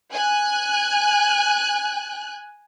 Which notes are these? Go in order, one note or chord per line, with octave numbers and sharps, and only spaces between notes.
G#5 F#6